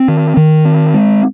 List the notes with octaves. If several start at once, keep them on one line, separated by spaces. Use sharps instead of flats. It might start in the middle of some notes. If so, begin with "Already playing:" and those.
Already playing: C4
D#3
D#3
C4
G#3